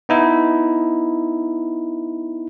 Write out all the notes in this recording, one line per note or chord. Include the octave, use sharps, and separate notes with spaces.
B3 D#4 E4